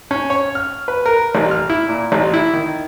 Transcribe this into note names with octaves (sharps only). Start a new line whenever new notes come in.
C#4
C#5
F6
B4
A#4
A1
F6
E4
A#2
A1
E4
D#3